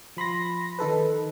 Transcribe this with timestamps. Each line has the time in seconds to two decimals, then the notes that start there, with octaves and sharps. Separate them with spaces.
0.17 F3 B5 C6 A#6
0.79 D#3 D#4 A4 B4